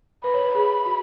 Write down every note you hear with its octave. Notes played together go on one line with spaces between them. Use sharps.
B4 B5
C#5
B4
G#4 B5
F#4